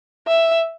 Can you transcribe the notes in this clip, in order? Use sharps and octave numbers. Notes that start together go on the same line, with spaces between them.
E5